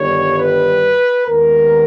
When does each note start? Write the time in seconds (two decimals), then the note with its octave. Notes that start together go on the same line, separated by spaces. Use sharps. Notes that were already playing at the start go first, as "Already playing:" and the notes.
Already playing: G1 G2 D#3 G3 C#5
0.37 B4
1.26 D#2 D#3 G#3 B3 A#4